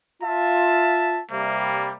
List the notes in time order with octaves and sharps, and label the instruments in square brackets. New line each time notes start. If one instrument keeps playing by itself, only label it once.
[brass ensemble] F4 E5 [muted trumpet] A5
[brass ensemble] C3 G3 [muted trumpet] A#3